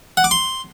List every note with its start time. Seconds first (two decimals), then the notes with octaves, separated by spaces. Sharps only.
0.17 F#5
0.24 D6
0.31 C6